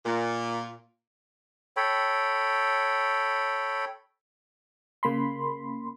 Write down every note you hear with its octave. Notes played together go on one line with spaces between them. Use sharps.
A#2
A4 C#5 G5 B5
C#3 A#3 B5 C6